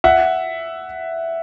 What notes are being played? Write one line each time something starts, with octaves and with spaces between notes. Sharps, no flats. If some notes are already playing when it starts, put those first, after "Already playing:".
E5 F#5